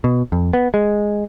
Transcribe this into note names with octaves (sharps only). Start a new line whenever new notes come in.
B2
F2
B3
G#3